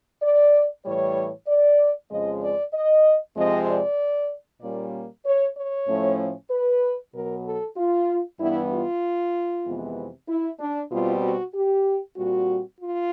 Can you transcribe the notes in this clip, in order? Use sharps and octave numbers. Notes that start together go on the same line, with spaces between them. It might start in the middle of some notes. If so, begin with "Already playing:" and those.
D5
A2 E3 G3 C#5
D5
F2 C#3 F3 G#3 D#5
D5
D#5
F2 C3 F3 G#3 C4 D#5
D5
A#2 G3 A#3 C#4 D5
C#5
C#5
A2 F3 A3 C#4
B4
B2 F#3 B3 A#4
A4
F4
G2 E3 G3 B3 E4
F4
F2 C3 E3 G#3 B3
E4
D4
B2 G3 C4 F4
F#4
G4
A#2 G3 C4 F#4
F4